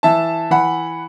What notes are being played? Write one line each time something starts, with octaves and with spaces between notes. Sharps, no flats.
E3 E5 A5
E3 F#5 B5